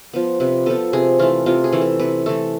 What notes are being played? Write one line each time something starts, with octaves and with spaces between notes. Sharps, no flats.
F3 B3
C3 B4
F3 B3 A4
C3 G#4
E3 A3 F4
C3 F4
G#4
E3 A3
A4
C3 B4
E3 A3 A4